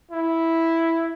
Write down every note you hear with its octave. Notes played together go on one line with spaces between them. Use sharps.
E4